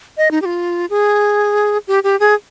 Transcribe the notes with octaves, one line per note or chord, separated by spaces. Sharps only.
D#5
D#4
G4
F4
G#4
G4
G4
G#4